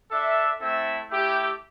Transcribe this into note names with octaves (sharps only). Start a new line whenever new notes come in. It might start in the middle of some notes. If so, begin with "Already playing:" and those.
D4 A4 E5
A3 C4 E4 A4 E5
A3 E4 G4